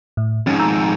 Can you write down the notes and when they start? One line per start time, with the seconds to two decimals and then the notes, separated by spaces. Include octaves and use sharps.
0.17 A2
0.47 F2 G#2 C#4
0.59 A#5 E6 G6